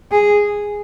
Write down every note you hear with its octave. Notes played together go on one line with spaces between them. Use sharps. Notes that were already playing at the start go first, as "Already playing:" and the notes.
G#4